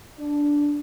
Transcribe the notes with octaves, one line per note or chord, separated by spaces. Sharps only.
D4